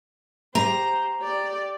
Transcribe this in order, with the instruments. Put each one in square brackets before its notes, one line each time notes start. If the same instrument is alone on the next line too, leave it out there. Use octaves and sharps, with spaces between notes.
[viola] G4 C5 [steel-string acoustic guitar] A#5
[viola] G4 D5